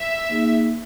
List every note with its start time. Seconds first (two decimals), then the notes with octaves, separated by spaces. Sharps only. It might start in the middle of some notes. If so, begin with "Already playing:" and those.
Already playing: E5
0.29 A#3 D#4 G#4